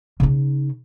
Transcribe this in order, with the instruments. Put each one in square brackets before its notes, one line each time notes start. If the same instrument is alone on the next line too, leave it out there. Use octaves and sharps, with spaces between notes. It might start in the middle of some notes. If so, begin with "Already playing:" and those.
[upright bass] C#3 D#4